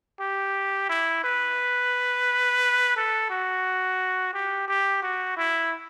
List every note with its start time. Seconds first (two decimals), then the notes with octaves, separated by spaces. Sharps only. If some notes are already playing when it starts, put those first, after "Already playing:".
0.20 G4
0.89 E4
1.24 B4
2.96 A4
3.30 F#4
4.34 G4
4.68 G4
5.03 F#4
5.37 E4